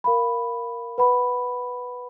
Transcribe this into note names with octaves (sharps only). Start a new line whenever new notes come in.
A#4 F5 B5
B4 F#5 B5